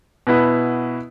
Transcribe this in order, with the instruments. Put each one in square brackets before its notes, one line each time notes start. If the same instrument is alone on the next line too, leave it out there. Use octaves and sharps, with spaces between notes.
[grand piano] B2 B3 E4 B4